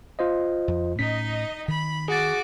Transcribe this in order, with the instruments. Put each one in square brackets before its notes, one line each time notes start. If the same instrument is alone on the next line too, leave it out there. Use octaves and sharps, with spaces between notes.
[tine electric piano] F4 C5 D#5
[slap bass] F2
[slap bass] A2 C#4 [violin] D#4 D#5 [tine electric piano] B6
[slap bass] D#3 [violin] B5
[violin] F#4 D6 [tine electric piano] G#4 A6